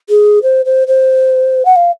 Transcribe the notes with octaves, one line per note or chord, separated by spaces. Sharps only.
G#4
C5
C5
C5
F#5
F5